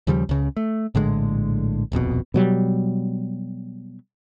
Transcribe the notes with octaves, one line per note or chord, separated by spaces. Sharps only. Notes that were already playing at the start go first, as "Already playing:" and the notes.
D#2 C#3 F3 G3
C#2 C#3
A3
A#1 A2 D3 G#3
D#1 A#1 F2 B2
B2 F#3 G3